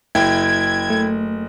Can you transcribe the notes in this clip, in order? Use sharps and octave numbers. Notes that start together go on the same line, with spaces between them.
F#1 E4 G5 G#6
A3